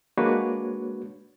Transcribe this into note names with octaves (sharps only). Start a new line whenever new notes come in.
G#3 A#3 D4 F#4 B4 C#5